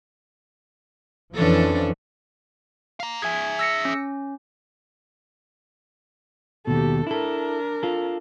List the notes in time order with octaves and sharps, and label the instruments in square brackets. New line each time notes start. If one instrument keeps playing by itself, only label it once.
[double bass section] F2 E3 F3 [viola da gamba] C#4 D4 A4
[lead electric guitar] F5 A#5
[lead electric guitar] G#4 E5 [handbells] G#5 G#6
[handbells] E6 A#6 C#7
C#4
[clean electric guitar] D#2 B2 [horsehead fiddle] G4 A4
[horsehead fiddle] D4 A#4 [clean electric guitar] E4 A4
[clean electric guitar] F4 A4